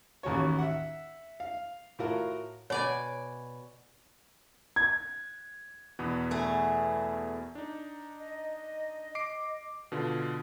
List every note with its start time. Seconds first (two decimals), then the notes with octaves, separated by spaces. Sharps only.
0.23 A1 D#2 F#4 C#5
0.58 E5 F#5
1.40 F5
1.99 A2 F4 F#4 A#4
2.70 B2 C#5 D5 G#5
4.76 G#6
5.99 E2 B2 B3
6.31 A3 G#4
7.55 D4 D#4
8.19 D#5
9.15 D6 C7 D7
9.92 B2 D3 F4